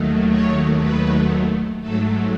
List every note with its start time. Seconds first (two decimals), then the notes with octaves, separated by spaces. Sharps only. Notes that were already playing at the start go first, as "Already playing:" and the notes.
Already playing: D#2 D#3 F#3 A3
0.30 C#5
0.80 B4
1.80 G#2 F#3 A3 A4